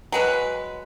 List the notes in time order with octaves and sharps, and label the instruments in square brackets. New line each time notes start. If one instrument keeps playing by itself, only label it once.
[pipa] F#3 G#3 B4